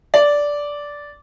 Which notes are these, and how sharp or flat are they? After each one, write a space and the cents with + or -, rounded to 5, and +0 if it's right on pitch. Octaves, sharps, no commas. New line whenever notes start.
D5 -10